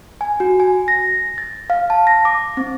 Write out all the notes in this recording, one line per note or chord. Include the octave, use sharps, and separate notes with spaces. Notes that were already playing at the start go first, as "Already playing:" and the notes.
G#5
F#4
G#5
A#6
A6
F5
A5
A#6
D6
C4